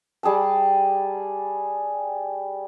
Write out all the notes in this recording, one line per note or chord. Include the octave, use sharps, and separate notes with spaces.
G3 G#4 G5 A5